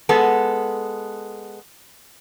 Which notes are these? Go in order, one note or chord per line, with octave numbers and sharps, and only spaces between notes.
G#3 B3 A4